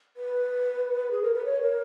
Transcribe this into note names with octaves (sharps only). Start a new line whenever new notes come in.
B4
G#4
A#4
B4
C#5
A#4